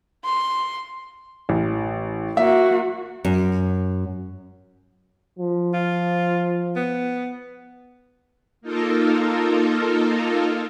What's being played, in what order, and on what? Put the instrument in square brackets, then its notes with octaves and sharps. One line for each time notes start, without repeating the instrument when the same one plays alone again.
[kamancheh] C6
[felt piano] A1
[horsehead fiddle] A#3 F#4 [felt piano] E5
[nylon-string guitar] F#2
[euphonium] F3
[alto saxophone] F4
B3
[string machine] A#3 D#4 F4 A4 A#4